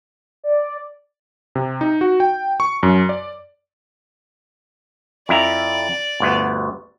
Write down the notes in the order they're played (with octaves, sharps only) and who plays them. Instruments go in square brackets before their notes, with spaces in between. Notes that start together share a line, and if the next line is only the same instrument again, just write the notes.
[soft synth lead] D5
[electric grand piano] C3
D#4
F#4
G5
C#6
F#2
D5
[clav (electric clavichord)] F2 E4 A#5 [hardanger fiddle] D5
[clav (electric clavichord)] G1 D2 B3